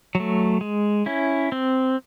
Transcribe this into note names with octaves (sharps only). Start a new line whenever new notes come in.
F#3
A3
G#3
C#4 E4
C4